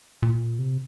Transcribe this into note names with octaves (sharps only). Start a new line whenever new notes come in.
A#2
C3